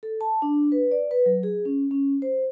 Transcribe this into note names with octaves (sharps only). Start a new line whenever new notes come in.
A4
A5
D4
B4
D5
B4
F#3
G#4
C#4
C#4
C5